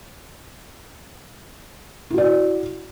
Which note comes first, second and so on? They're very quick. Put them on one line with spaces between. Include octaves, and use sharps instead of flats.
E4 F#4 D5